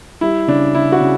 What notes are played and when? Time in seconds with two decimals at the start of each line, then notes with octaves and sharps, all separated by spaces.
0.21 G3 E4
0.48 C#3 D4
0.75 C#3 E4
0.92 F#4
1.00 C#3